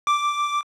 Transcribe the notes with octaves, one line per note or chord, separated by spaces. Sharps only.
D6